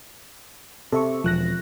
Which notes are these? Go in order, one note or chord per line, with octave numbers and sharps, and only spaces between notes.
C3 A4 E5 C#6
E1 F3 F#6 A#6